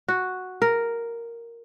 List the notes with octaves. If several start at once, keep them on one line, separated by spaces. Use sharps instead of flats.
F#4
A#4